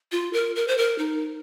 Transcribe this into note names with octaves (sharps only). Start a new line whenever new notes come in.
F4
A#4
A#4
C5
A#4
D#4